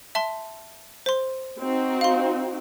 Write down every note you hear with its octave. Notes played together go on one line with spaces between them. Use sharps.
E5 A5 C6
C5 C6
C4 D#4 F#4
F5 C6